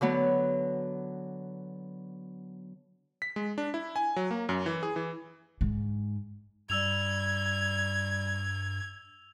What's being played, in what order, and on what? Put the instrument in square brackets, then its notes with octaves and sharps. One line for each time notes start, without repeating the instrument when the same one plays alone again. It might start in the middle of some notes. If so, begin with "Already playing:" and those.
[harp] D3 F#3 B3
[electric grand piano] B6
G#3
D4
E4
G#5
F#3
A#3
F#2
E3
G#4
E3
[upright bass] G#2
[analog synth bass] G2 [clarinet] G3 [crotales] E6 F7 [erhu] G#6